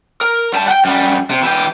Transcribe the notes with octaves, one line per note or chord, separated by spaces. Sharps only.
A#4
G3 A5
F#5 G5
F#2 G3
C3
E3 G4